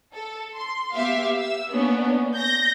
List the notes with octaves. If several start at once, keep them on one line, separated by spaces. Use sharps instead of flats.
A4
C6
B3 G4 E5 F5
E6
A#3 B3 C#4 D4
G6 A#6